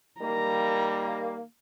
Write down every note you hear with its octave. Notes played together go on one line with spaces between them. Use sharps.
D#3 G3 A#3 A#5